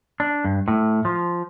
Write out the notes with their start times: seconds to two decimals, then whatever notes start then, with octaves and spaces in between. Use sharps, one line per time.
0.20 D4
0.45 G2
0.68 A2
1.05 F3